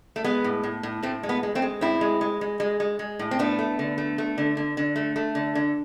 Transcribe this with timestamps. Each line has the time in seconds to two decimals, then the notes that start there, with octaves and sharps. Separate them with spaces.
0.16 A3
0.24 G#3 B3
0.44 A2
0.63 A2
0.83 A2
1.02 A2 A3 C4
1.23 G#3
1.29 B3
1.43 G#3
1.55 A3 C4
1.62 G#3
1.81 A2 C4 E4
2.01 G#3
2.21 G#3
2.41 G#3
2.60 G#3
2.80 G#3
2.99 G#3
3.19 A2
3.31 C4
3.39 A3 B3 D4
3.59 A3
3.79 D3
3.98 A3
4.18 A3
4.38 D3
4.57 D3
4.77 D3
4.96 A3
5.16 A3
5.35 D3
5.55 D3